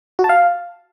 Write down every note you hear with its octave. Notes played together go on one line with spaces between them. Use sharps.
F#4
A5
F5